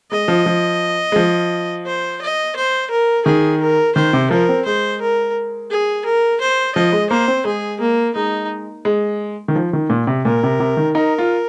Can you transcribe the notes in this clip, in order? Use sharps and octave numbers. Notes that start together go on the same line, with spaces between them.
G#3 D#5
F3
F3
G#3
F3
C5
D#5
C5
A#4
D#3 G#4
A#4
D#3 C5
C3
F3 A#4
C4
G#3 C5
A#4
G#4
A#4
C5
F3 D#5
G#3
A#3 C5
C4
G#3 G#4
A#3
G#3 D#4
G#3
D#3
F3
D#3
A#2
C3
A#2 A#4
C3
C3
D#3
D#4 A#4
F4